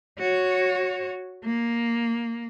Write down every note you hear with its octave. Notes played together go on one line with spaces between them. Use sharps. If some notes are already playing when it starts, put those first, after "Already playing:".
F#4 C#5
A#3